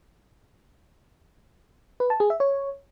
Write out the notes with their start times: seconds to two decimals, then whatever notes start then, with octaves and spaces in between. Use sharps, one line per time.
2.00 B4
2.10 A5
2.20 G#4
2.30 E5
2.40 C#5